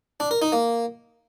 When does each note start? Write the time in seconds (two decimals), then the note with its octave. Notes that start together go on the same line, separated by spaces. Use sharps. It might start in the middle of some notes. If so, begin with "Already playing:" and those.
0.20 D4
0.31 A#4
0.42 D#4
0.52 A#3